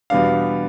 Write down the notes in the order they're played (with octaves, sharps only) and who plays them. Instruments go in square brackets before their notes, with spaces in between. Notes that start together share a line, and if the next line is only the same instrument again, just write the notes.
[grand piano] E2 B2 G3 B3 D4 F5